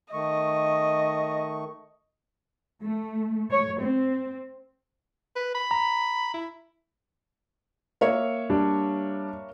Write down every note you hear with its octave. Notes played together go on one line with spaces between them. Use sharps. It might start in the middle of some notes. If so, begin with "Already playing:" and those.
D#3 A3 D#5 C#6
A3
C#5
C4
B4
B5
A#5
E4
A#3 C#5 E5
G3 D4